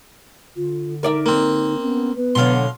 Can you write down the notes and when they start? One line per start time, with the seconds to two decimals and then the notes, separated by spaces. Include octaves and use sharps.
0.56 D3 F4
1.03 D#4 A#4 D5 E5
1.26 A#3 C4
1.80 B3 C#4
2.16 B3 B4
2.35 B2 D3 F#3 F5 C6